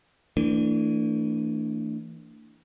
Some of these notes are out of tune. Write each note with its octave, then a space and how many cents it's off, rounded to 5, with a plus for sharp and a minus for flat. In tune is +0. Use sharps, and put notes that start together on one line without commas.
E3 +0 A3 +45 D4 +0